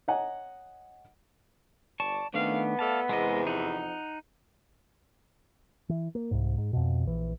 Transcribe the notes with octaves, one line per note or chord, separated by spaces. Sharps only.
C#5 D#5 F#5 G#5 A#5
G1 D5 A5 C#6
F2 D#3 A3 B3 D4 F5
A3 A4 D5 F5 A5
E2 C3 G#3 A#4 D#5
F2 D#4 F#5
E3
A#3
C2 G#2
G#2
F2 B2
A#1 E3